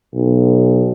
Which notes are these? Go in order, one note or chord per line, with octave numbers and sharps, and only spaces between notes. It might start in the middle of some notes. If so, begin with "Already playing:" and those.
B1